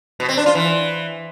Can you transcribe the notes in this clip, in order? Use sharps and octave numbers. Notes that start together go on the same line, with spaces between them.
B2
C4
D4
F4
E3